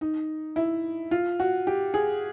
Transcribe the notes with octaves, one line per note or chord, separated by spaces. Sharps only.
D#4
E4
F4
F#4
G4
G#4